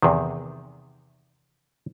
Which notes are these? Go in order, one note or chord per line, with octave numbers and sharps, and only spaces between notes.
E2 C3 D#3